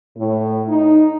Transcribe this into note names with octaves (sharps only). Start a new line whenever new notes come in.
A2
D#4